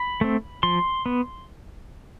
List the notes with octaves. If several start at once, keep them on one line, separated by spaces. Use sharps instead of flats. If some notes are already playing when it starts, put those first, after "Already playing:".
Already playing: B5
A3 C4
F3 C6
B3